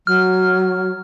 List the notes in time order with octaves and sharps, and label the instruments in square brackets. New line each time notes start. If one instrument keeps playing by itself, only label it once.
[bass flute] F#3 [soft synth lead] F6